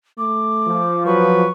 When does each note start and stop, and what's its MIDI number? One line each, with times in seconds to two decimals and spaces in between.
0.18 0.83 57
0.18 1.04 86
0.68 1.49 53
1.06 1.48 54
1.06 1.48 71
1.06 1.51 85